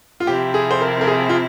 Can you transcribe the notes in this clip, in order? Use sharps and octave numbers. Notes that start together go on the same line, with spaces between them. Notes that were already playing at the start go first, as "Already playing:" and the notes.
F4
C3 F3 C4 E4 G4
G#4
C5
A#4
A#4
G#4
F4